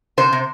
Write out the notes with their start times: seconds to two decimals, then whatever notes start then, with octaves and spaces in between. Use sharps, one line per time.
0.18 C3 C5
0.33 C3